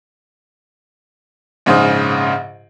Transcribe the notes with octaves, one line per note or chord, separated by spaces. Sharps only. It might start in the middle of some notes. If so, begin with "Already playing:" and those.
A#1 G#2 C#3 C5 D#6